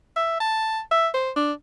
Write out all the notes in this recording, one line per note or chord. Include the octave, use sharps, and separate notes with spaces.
E5
A5
E5
C5
D4